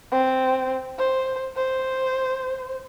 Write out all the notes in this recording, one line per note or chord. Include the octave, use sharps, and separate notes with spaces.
C4
C5
C5